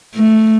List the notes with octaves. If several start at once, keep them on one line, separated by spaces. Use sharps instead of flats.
A3